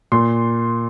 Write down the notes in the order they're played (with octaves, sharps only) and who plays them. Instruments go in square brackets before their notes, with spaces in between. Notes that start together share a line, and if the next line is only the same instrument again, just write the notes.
[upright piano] A#2 C6